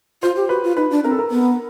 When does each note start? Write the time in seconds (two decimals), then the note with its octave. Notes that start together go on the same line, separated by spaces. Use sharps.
0.22 F4 C5
0.36 G4
0.49 F#4 B4
0.63 F4
0.77 D#4 B4
0.91 D4
1.04 C4 A#4
1.11 A4
1.18 A#4
1.31 B3